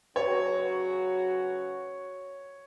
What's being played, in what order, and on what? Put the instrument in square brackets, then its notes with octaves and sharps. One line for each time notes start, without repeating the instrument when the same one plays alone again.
[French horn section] C#3 F#3 C#4 F#4 B4 [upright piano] C#5